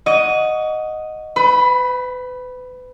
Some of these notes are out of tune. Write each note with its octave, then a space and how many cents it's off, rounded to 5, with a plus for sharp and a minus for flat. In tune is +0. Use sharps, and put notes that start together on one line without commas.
D#5 +0 F#5 -10 C#6 +40
B4 +35 B5 -5